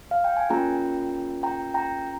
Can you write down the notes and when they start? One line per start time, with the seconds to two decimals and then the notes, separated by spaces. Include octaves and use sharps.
0.11 F5
0.24 G5
0.37 G#5
0.49 A#3 C#4 F4 G#4 G5 A#5
1.43 G5 A#5
1.74 G5 A#5